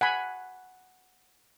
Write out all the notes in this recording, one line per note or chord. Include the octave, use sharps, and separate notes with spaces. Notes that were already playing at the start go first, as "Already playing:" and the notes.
F#5 G#5 B5